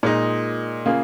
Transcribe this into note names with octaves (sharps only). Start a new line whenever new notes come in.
A#2 G#3 D#4
C#3 A#3 F4 G#4